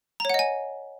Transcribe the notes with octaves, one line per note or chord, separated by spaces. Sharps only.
C#5 D#5 F#5 G#5 A#5